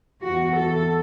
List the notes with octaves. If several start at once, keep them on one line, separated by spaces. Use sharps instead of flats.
E2 E3 F#4
A4